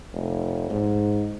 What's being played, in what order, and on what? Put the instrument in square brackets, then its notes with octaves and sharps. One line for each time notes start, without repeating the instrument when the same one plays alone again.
[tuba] F1
G#2